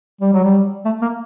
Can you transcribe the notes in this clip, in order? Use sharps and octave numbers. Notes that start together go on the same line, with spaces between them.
G3
F#3
G3
A3
A#3